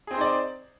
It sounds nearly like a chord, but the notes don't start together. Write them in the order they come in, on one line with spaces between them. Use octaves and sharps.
G#4 C4 C5 D#4 D5